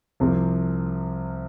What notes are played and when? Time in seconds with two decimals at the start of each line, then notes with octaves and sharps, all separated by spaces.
0.20 C2 C3 F3 C4